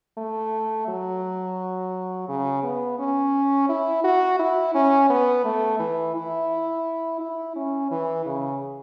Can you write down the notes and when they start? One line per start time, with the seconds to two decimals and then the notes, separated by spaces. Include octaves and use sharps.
0.18 A3
0.88 F#3
2.29 C#3
2.64 B3
2.99 C#4
3.69 E4
4.04 F#4
4.39 E4
4.74 C#4
5.10 B3
5.45 A3
5.80 E3
6.15 E4
7.20 E4
7.56 C#4
7.91 E3
8.26 C#3